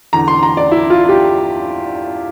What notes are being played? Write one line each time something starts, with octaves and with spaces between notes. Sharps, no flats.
E2 D3 A#5
C6
A#5
D5
E4
F4
G4